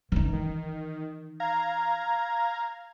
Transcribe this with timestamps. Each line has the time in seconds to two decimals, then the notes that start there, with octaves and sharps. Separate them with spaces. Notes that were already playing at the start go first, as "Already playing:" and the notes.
0.12 E3 D#4
0.33 D#3
1.40 F5 A#5 G#6